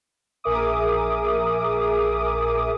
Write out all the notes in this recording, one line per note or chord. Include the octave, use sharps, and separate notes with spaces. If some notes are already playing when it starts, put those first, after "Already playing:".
A#1 G#4 A#4 E5 D6 D#6